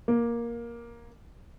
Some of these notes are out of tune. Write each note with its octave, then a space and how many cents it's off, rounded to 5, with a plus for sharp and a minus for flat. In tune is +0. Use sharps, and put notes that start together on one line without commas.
A#3 +10